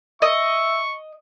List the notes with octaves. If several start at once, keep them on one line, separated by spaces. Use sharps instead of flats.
D#5 E5 C#6